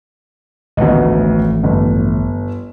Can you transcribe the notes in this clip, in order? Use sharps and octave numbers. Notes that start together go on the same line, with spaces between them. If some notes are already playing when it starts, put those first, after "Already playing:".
A1 D2 D#3 B3 D#5
G1